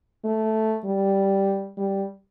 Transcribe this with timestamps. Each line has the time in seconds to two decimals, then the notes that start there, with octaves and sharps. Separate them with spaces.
0.25 A3
0.85 G3
1.78 G3